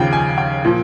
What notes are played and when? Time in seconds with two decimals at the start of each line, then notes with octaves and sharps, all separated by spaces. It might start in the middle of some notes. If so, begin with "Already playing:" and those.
Already playing: D#2 C#3 F3 G5
0.13 G#5
0.38 G5
0.65 A#2 F3